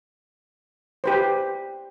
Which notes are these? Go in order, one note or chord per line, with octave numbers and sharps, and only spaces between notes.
G4 B4 C5